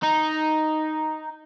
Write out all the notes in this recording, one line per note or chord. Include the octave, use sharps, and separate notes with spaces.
D#4